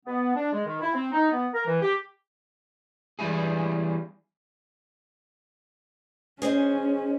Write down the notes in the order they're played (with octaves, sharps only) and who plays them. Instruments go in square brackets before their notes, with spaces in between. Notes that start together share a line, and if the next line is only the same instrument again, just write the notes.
[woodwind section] B3
D4
G#3
D#3
E4
C4
D#4
B3
A#4
E3
G4
[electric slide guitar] E3 G3 E4 G#4
[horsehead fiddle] C#4 [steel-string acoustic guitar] G#4 C5 D#5